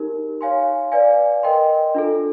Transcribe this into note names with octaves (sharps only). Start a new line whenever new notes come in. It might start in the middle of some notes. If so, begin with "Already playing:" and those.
Already playing: D#4 G4 A#4
C#5 F5 G#5 C6
B4 D5 F5 G#5
A#4 D#5 G5 C6
D4 F4 A4